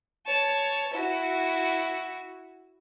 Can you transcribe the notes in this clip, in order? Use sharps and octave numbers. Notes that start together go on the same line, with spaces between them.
C#5 A5
E4 F#4